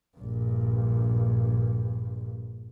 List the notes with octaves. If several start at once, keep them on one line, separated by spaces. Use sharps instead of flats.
A#1 G2